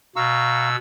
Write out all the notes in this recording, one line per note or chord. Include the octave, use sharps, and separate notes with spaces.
B2 F5 A#5 C#6 E6